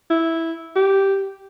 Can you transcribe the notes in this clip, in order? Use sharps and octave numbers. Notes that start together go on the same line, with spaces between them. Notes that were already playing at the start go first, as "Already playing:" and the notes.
E4
G4